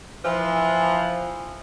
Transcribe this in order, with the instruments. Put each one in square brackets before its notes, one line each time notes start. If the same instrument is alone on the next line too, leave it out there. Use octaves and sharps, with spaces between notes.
[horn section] E3 F3